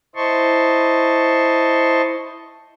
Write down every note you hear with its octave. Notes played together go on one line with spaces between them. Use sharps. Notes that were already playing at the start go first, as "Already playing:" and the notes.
E4 C5 D#5 A5 C6 C#6